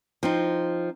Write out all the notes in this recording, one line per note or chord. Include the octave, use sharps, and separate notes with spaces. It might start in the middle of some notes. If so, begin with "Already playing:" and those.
F3 C4 D#4